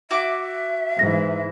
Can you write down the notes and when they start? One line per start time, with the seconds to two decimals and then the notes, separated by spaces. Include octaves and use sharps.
0.11 F#4 E5 D6
0.99 G#2 E3 A#6